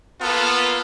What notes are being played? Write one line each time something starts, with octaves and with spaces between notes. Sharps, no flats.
A#3 B3 F4 A4